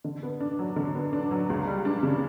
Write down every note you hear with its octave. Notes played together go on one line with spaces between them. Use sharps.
D3
B3
D4
F#3
D3
B3
D4
F#3
C#2
G3
D4
C#3